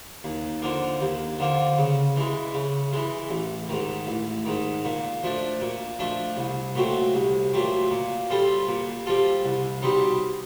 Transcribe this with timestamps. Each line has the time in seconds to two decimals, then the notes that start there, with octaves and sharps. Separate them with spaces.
0.24 D#2
0.62 D3 F3 A#3
1.01 D#2
1.39 D3 F3 A#3
1.78 C#3
2.17 E3 G#3
2.54 C#3
2.93 E3 G#3
3.30 A1
3.69 G#2 D#3
4.07 A1
4.46 G#2 D#3
4.85 A#2
5.23 F3 A3 D4
5.61 A#2
5.99 F3 A3 D4
6.37 C2
6.75 A#2 F#3 A3 C4
7.14 C2
7.53 A#2 F#3 A3 C4
7.91 A#2
8.30 G3 C4 F4 A4
8.68 A#2
9.06 G3 C4 F4 A4
9.45 C2
9.82 B2 G3 C4 D#4